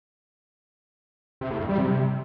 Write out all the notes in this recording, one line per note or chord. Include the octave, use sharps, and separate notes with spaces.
C3
A2
G2
G3
C3